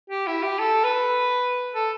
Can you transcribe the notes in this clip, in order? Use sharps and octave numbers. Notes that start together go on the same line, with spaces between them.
G4
E4
G4
A4
B4
A4